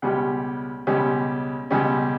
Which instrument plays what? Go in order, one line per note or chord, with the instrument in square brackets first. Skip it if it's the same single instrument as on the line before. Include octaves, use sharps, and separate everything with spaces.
[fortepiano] C#2 B2 G3 C#4 G4
C#2 B2 G3 C#4 G4
C#2 B2 G3 C#4 G4